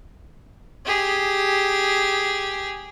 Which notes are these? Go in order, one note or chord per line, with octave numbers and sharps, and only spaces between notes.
G4 G#4